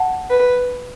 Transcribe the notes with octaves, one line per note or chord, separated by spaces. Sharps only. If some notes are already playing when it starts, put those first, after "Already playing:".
Already playing: F#5 A5
B4